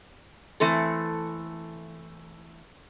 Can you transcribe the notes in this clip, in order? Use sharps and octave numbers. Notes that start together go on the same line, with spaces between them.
E3 A3 C4 A4